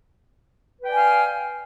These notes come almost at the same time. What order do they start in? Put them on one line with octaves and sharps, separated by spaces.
B4 G5 D5 G#5 F5